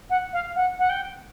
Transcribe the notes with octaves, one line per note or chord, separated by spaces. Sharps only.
F#5
F5
F#5
F#5
G5